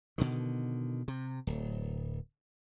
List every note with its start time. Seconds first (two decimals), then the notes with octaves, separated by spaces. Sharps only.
0.18 B2 D3 D#3
1.08 C3
1.47 D1